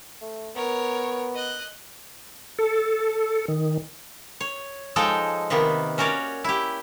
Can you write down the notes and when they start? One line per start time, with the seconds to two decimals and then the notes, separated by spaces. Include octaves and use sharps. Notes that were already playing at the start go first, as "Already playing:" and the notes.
0.22 A3
0.55 B3 A#4 C#5
1.35 D#5 F#6
2.59 A4
3.48 D#3
4.40 C#5
4.96 F3 G#3 D#4 A4 G5
5.50 C3 D#3 A#3 B3
5.98 C#4 F#4 A#4 C#5 D5
6.44 E4 G4